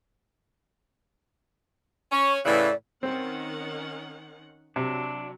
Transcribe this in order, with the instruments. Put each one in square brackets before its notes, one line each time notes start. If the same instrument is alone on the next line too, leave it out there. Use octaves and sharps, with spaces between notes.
[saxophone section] C#4 [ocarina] C#6
[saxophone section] A2 C#3 E3 [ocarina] D5
[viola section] D#3 C#4 F#5 [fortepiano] C4
[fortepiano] C3 [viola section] F#3 [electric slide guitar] D4